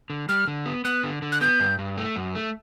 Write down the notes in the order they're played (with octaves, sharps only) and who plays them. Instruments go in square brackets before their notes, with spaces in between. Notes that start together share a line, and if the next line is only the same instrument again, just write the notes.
[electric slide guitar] D3
[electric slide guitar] G3 [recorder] F6
[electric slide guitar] D3
B3
[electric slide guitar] B3 [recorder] F#6
[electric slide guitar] D3
D3
[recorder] F#6
[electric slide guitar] B3 [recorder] G6
[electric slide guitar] G2
G2
A3
F#2
A3